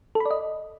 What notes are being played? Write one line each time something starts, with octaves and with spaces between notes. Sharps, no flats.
A4
B5
D5
D#5